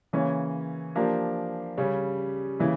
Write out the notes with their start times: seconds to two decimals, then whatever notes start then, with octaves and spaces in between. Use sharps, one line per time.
0.13 C#3 E3 A#3 C#4
0.96 F3 A#3 D4 G4 A#4
1.77 C#3 G3 C#4
2.59 C#3 E3 A#3 E4